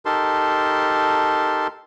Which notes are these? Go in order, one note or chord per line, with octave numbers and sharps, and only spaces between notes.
D#4 G4 A4 A#4 A5 C6